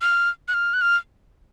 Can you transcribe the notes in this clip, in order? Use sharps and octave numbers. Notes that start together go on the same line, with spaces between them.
F6
F#6
F6
F#6
F6